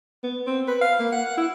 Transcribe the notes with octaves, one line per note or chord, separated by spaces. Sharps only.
B3
C4
B4
F5
A#3
F#5
E4